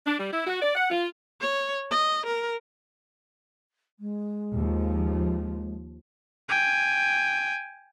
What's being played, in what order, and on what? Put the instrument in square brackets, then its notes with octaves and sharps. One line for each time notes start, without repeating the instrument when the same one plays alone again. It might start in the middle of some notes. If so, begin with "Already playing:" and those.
[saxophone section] D4
G3
E4
F#4
D5
F#5
F4
[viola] C#5
D#5
A#4
[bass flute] G#3
[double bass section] D#2 F3
[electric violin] G5 G#5